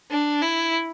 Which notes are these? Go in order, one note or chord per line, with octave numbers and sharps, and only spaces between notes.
D4
E4